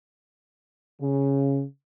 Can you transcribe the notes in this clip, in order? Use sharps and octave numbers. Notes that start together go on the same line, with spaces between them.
C#3